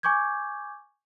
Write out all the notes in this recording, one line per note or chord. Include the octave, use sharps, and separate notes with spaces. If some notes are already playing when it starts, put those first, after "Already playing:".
G#5 C#6 D6 G6 G#6